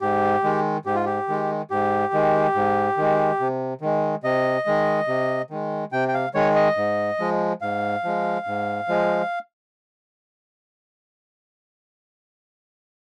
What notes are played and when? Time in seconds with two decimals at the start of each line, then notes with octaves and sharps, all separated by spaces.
0.01 G#2 G4
0.44 D#3 G#3
0.85 G#2 G4
0.95 F4
1.06 G4
1.29 D#3 G#3
1.70 G#2 G4
2.13 D#3 G#3
2.55 G#2
2.97 D#3 G#3
3.40 C3
3.81 D#3 G#3
4.24 C3 D#5
4.66 D#3 G#3
5.08 C3
5.50 D#3 G#3
5.92 C3 G5
6.08 G5
6.14 F5
6.34 D#3 G#3 C#5
6.56 D#5
6.77 G#2
7.19 F3 G#3
7.62 G#2 F5
8.04 F3 G#3
8.47 G#2
8.88 F3 G#3